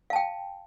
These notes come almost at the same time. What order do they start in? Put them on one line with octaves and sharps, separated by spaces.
F5 A5 G5